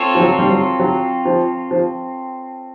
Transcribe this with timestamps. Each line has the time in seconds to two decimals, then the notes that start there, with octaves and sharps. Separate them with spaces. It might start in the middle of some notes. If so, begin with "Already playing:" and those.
Already playing: C4 F4 A4 C#5
0.15 F3
0.20 F#3
0.39 G3
0.50 F#3
0.80 F#3
1.25 F3
1.71 F3